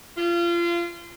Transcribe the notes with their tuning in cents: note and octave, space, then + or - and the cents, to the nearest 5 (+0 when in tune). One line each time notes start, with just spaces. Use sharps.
F4 -30